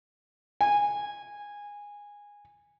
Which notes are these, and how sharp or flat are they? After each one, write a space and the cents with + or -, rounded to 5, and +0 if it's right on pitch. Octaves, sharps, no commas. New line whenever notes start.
G#5 -15